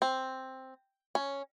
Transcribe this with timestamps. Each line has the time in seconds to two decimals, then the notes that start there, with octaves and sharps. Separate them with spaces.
0.02 C4
1.15 C#4